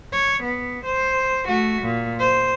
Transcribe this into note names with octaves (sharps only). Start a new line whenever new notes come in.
C#5
B3
C5
A3 F#4
A#2
C5